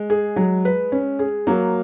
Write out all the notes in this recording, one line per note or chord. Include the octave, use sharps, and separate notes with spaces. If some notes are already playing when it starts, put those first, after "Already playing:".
Already playing: G#3
G#4
F#3
B4
C#4
G#4
F#3 A#3